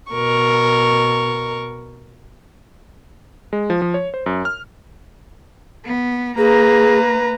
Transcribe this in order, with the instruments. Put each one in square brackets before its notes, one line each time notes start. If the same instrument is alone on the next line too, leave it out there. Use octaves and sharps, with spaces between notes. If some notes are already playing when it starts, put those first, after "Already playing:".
[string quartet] B2 A#4 C#6
[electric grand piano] G#3
F3
F3
C#5
C5
F#2
F6
[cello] B3
[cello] A#3 [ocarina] G#4 [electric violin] B4 A#5